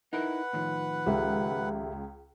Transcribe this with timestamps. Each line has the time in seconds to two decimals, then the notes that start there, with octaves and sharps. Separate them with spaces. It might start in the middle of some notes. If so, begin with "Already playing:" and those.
0.13 D#4 E4 A#4 B4 F#5
0.53 A2 D#3 F3
1.06 C#2 G4 A4 E5